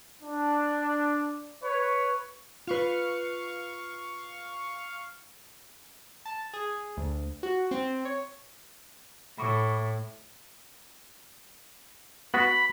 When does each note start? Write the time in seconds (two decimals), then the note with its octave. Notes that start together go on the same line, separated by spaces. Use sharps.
0.23 D4
1.64 B4 C#5
2.67 F4 B4 F5 C#6
6.25 A5
6.53 G#4
6.97 D2
7.43 F#4
7.71 C4
8.05 C#5
9.38 A2 B5 C#6 D6
12.34 B3 F#4 B5